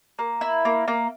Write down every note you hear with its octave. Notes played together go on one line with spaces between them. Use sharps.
A#3
E4
A#3
A#3